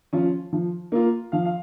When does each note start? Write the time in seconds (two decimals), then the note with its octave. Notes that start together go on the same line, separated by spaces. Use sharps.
0.13 F3 C#4 F4
0.53 F3
0.92 A#3 F4
1.32 F3 F5
1.45 F5